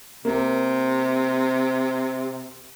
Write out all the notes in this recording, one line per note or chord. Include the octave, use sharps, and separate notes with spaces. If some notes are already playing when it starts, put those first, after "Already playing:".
C3 A#3